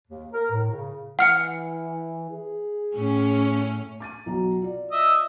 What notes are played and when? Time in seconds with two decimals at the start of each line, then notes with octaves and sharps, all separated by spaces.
0.08 D#2
0.33 A#4
0.51 A2
0.71 C#3
1.19 E3 F#5 F6 C#7
2.31 G#4
2.92 A2 C#4
4.00 D6 A6 D#7
4.26 B1 F#3 A#5
4.62 F4 D5
4.91 D#5 E5